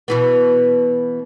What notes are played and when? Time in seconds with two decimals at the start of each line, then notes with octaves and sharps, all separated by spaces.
0.08 B2 E3 B3